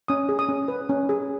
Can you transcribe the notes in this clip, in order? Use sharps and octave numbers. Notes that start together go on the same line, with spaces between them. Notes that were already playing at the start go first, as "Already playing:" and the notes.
C#4 D#6
G#4
D#6
C#4
B4
C#4
G#4